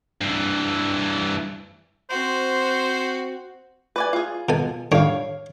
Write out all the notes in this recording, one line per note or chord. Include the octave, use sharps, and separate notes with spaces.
G2 E3
C4 F#4 C5
B4 D5 G#5
F4 G#4
B2 A4 G#5
D3 G3 D4 C#5 F5